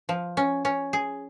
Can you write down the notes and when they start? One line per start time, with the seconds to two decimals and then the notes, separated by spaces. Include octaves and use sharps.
0.09 F3
0.37 C#4
0.65 C#4
0.93 G#4